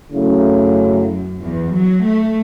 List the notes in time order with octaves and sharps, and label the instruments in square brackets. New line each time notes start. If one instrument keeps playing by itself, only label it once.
[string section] F#2 [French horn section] C#3 F#3 A3 C#4 E4
[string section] E2
F#3
A3